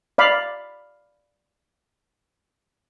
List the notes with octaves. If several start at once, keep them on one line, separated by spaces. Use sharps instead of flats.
D5 F5 B5